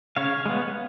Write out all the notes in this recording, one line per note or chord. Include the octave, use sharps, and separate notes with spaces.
C#3 C#5 F5
G#3 B3